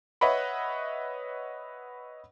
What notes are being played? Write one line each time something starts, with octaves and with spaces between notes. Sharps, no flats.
B4 C#5 D#5 E5 F#5 B5